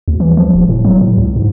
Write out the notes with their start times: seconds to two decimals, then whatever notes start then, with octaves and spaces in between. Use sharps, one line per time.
0.08 D2
0.20 E3
0.37 F3
0.55 D#1
0.69 A2
0.84 F#3
1.01 A2
1.18 C#2
1.36 G#2